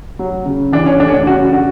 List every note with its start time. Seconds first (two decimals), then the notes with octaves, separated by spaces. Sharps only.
0.19 F#3
0.46 C#3
0.72 E3 D4
0.86 C#4
1.00 A3 D4
1.08 C#4
1.14 D4
1.26 C#3 F#4
1.52 F#4